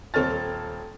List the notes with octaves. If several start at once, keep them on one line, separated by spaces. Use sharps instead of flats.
D#1 C4 A4 C#5 F6 A6